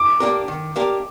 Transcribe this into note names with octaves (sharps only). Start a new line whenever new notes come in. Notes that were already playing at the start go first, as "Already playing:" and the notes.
Already playing: D6
A#3 D4 G4 A#4
D#3
A#3 D4 G4 A#4